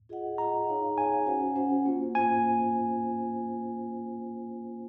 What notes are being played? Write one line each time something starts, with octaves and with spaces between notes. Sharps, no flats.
F4 G#4 D#5 F#5
F4 G#4 D#5 F#5 A#5
D#4 G#4 C#5 F5
D#4 G#4 C#5 F5 G#5
C#4 F#4 C5 F#5
C#4 F#4 C5 F#5
A#3 F4 C5
A#3 F4 C5 G#5